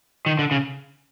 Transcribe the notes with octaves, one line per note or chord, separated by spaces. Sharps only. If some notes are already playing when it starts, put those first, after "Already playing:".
D#3
D3
C#3